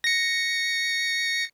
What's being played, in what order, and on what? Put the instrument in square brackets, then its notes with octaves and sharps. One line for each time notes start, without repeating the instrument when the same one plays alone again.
[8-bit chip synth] A#6 C#7